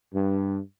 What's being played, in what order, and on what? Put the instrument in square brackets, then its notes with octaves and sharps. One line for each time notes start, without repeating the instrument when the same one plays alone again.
[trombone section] G2